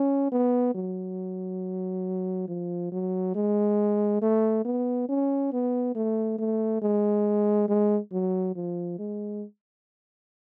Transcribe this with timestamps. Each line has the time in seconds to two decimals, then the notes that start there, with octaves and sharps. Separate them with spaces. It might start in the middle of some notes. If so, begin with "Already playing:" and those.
Already playing: C#4
0.32 B3
0.75 F#3
2.48 F3
2.92 F#3
3.35 G#3
4.22 A3
4.65 B3
5.09 C#4
5.52 B3
5.95 A3
6.39 A3
6.82 G#3
7.68 G#3
8.12 F#3
8.56 F3
8.99 G#3